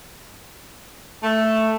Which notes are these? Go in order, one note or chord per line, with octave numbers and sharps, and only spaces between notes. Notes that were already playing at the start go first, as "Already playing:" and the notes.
A3